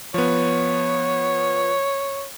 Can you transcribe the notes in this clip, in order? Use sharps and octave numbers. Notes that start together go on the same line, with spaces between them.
F3 B3 C#5